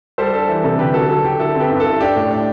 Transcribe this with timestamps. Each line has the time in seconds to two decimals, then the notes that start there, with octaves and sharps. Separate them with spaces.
0.18 G3 A4 C5
0.33 D4 A4
0.48 E3
0.63 C3 A4
0.79 D3 G4 B4
0.94 F#3 A4
1.09 F#3 A4
1.24 D3 G4
1.39 E4 A4
1.55 C4
1.60 G4 B4
1.70 G2
1.80 A4
1.85 E4
2.00 D4 G4
2.16 A2
2.31 D4